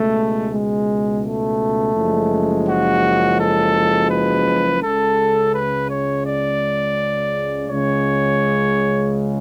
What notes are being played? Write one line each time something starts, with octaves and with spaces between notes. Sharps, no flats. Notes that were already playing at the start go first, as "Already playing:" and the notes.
Already playing: C#2 B2 G#3 A3
G#3
A3
F#1 F#2 F3 G#3
F#4
A4
B4
C#2 C#3 G#3 A4
B4
C#5
D5
C#2 C#3 G#3 C#5